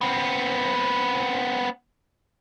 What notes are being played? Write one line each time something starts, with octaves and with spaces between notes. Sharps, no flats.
B3 C4